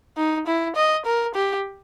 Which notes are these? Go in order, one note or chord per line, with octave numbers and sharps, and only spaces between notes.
D#4
E4
D#5
A#4
G4